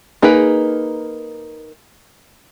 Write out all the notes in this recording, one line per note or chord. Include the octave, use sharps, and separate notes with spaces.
A#3 D#4 G#4 A#4 B4